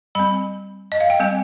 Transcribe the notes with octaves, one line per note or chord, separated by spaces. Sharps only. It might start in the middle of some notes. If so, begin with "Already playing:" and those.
G3 C4 B5
D#5
F5
G5
G3 C4 G#5